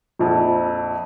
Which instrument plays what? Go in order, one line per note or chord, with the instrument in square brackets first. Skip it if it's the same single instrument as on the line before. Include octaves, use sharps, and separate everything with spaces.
[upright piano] A#1 F2